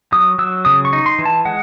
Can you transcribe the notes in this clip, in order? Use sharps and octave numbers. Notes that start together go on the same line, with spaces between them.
F#3 D#6
F#3 E6
C#3 D#6
C#6
D#4
C6
E3
A5
G#3 F#5